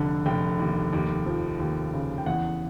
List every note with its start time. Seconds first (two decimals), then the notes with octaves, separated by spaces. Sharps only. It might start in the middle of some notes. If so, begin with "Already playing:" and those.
Already playing: F1 D3
0.26 F1 G5
0.59 D#2
0.93 D#2
1.26 F3
1.60 D#2
1.94 C#3
2.18 G5
2.26 E2 F#5